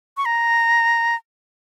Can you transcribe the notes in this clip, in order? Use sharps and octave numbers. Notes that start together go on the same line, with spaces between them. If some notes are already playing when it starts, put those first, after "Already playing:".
C#6
A#5